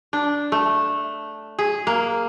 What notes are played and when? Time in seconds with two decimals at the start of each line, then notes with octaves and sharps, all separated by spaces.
0.13 D4
0.52 A3
1.59 G#4
1.87 A#3